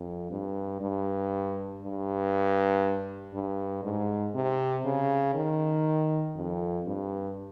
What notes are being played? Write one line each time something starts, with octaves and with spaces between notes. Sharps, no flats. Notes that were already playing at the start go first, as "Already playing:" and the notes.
Already playing: F2
G2
G2
G2
G2
G#2
C3
C#3
D#3
F2
G2